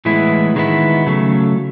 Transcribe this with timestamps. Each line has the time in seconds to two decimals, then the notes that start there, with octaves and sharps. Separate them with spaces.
0.05 A2 E3 G#3 B3 E4
0.56 D#3 G#3 B3 E4
1.06 C#3 F#3 A3